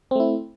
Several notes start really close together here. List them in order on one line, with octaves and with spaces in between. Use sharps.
C4 A3 E4